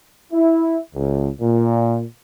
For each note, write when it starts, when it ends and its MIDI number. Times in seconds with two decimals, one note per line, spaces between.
0.33 0.79 64
0.95 1.28 37
1.41 2.04 46